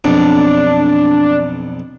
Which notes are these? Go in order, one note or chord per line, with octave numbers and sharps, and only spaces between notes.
B1 F2 D4